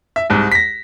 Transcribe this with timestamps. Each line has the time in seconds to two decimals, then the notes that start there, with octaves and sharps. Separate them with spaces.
0.16 E5
0.30 C2 G#2
0.52 A#6 B6